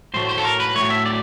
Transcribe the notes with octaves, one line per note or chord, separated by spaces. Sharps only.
A2 F#3 A3 C5
C5
A4
A#4
B4
A2 F#3 A3 C#5
E5
D5